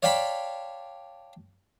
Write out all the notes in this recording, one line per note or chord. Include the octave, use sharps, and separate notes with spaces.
C#5 D5 F5 G5 A5 B5